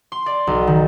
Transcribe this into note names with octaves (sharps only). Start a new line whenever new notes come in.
C6
D5
B1
D#3